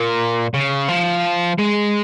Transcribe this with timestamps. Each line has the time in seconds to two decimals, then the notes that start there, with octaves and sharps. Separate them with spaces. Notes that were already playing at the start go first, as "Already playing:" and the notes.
Already playing: A#2
0.54 C#3
0.89 F3
1.58 G#3